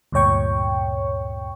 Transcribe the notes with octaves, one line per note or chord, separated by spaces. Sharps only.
D2 G2 A#2 C#5 G5 C#6